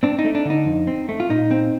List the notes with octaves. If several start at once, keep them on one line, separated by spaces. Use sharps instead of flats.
C4 D4
D#4
A3
D4
D3 D#4
F2
C4
A3
F4
A#2 D#4
C4